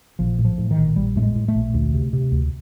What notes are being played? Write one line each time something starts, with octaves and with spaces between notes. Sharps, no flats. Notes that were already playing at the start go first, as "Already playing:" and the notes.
A#1 F3
A2
F3
A2
D#3
A#1
A#1 G3
A2 A3
G#3
A2
A3
A#1
D2
C3
C3
D2